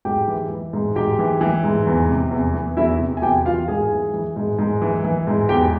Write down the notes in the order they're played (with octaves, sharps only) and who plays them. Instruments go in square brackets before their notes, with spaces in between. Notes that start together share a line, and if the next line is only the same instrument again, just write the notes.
[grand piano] G#2 G4 G5
E3
E3
G#2
G#2 G4 G5
E3
E3
G#2
E2
C3
E2
E3
E2 E4 E5
C3
G#5
E2 G4 G5
E3 F4 F5
G#2 G#4 G#5
E3
E3
G#2
G#2
E3
E3
G#2
E2 G4 G5